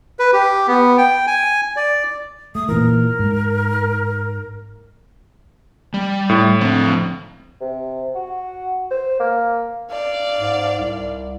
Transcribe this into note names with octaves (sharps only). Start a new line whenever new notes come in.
B4
G4
B3
G5
G#5
D5
A3 D#6
A#2 E3 A#4
G#2
G3
A2
D3 F3 C4
C3
F#4
C5
A#3
D5 F5
G#2
C2